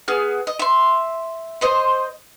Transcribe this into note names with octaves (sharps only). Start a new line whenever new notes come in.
B3 G#4 F6
D#5
E5 C6
C5 D#5 C6